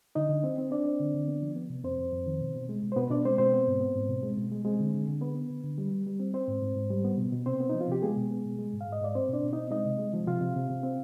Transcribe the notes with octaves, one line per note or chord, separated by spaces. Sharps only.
D3 D#4 D#5
D3
C4
C4
C4 D4 D5
C4
D3
D3
B3
F3
B3
C3
F2 C4 C5
F2
F2
D#3
B2
B2
G#3
B2
C5
B2 B3 B4
B2 D4 D5
G#3 C4 C5
B2 C4 C5
B3
G#2
B3
G#2
B2
G#3
B2
G#3
G#3 C4 G#4
D3
D3
D3
B3 B4
B3
D3
D3
G3
G3
G3
C4
C4 C5
G#2
G#2
G#2
G3
B3
B2
B2
C3 C4 C5
B3
D#4
F3
F4
C3 G4
G#3 B3 G#4
B2
B3
B2
G#3
G#2
F5
G#2 D#5
G#2 D5
C4 C5
B2 D4 D5
B2
C4 D#4 D#5
G#3 D#4 D#5
C3
G#3
F3
C3 F4 F5
C3
C3
C3
C4